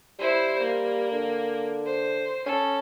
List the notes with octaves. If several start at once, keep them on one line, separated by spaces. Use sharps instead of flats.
G3 E4 C5
A#3
D3
C5
C#4 A4